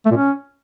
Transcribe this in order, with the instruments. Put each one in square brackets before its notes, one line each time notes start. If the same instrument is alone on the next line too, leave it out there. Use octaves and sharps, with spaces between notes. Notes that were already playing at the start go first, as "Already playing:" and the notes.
[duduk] A3
A#2
C#4